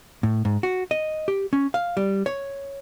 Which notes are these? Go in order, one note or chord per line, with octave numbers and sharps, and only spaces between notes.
A2
G#2
F#4
D#5
G4
C#4
F5
G3
C#5